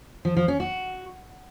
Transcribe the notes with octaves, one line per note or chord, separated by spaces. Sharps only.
F3
F3
C#4
F#4